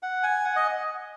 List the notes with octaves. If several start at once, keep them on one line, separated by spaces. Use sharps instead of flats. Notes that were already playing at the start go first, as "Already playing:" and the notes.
F#5
G#5
F#5
D#5